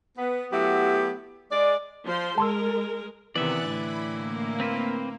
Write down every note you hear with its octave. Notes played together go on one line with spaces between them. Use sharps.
B3
F#3 A3 B3 E4 G4
G#3 D5
F3 C5 C6
G#3 A#4 A5 C6 E6
C3 D#3 E3 B3 D5 E5 F#6 A6
A2 D3 E4 B5
A#3
C4 B4 C5